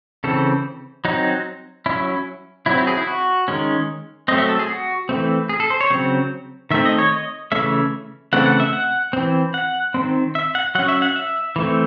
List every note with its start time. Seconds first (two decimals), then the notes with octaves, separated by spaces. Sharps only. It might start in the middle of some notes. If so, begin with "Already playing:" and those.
0.24 C#3 E3 C4 A4
1.05 F#3 C4 D#4
1.86 F#3 C#4 E4
2.66 F#3 C4 E4
2.77 E4
2.87 G#4
2.97 E4
3.07 F#4
3.48 D#3 G#3 C#4
4.28 F#3 A3 C4 D#5
4.38 E5
4.49 A4
4.59 G#4
4.69 F#4
5.09 E3 A3 C4
5.49 G#4
5.60 A4
5.70 C5
5.81 C#5
5.90 C#3 F#3 C4
6.71 D#3 A3 C4 E5
6.85 D#5
6.98 C#5
7.12 D#5
7.52 C#3 E3 A3 C#4 E5
8.33 C#3 E3 A3 C4 F#5
8.46 F#5
8.60 E5
8.73 F#5
9.13 E3 C4
9.54 F#5
9.94 D#3 A3 C4
10.35 E5
10.55 F#5
10.75 F#3 F#5
10.79 C#4
10.88 E5
11.02 F#5
11.16 E5
11.56 E3 A3 C4